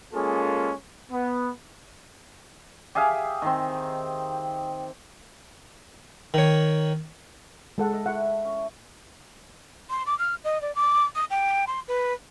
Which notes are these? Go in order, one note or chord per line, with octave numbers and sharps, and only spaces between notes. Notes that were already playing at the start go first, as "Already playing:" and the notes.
G#3 A#3 C#4 F4 G#4 A4
B3
G4 G#4 E5 F5
D#3 C4
D#3 C#5
G#3 A4 F#5
D#5 E5
A3 E4 E5 F#5
C#4
C6
D6
F6
D#5
D5
D6
D#6
G5
C6
B4